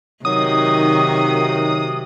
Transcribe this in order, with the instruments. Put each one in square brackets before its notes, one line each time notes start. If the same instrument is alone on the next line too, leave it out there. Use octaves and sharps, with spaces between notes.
[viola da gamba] C3 [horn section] D#3 F#3 [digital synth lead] D#6